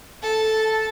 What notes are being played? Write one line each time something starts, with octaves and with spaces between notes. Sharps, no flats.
A4 A5